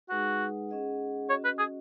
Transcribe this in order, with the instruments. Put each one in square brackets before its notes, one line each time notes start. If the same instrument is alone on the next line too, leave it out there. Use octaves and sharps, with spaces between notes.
[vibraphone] G#3 D#4 G#4 B4 F#5 [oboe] F#4
[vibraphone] C#4 G#4 D#5 F#5
[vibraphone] C#4 F#4 D#5 [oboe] C#5
[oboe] B4
G#4